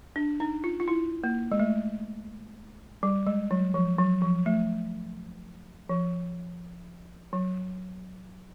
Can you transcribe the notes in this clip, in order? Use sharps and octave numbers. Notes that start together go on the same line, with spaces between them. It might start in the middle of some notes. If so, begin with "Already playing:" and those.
D4
D#4
F4
F4
E4
A#3
G#3
A3
G3
G#3
F#3
F3
F#3
F3
A3
F3
F#3